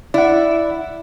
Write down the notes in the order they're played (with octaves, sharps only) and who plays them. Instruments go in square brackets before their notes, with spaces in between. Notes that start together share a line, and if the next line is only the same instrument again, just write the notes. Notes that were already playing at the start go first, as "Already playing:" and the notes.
[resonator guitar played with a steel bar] E4 [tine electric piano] D5 F#5